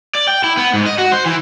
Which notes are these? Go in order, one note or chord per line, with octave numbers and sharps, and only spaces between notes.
D5
G5
E4
B3
G#2
D#5
F#4
C5
E3